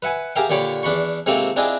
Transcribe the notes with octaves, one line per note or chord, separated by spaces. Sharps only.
B4 E5 F#5 G#5
G4 G#4 A#4 E5 F5 G5
A#2 D3 G4 C#5 B5 D6
E2 D4 B5 C#6
G#2 C3 A3 A#3 C4 F4
C4 D4 E4 F4 G#4 D#5